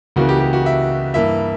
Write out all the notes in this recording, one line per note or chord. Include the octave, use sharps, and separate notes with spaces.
C#2 C#3 E3 A#3 F#4
G4
G4
F#4
E5
G2 E3 A#3 E5